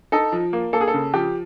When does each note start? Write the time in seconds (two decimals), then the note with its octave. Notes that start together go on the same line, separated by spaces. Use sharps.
0.12 D#4 A4
0.32 F3
0.53 A#3
0.73 A#3 A4
0.81 G#4
0.88 A4
0.94 C#3
1.14 F3 G4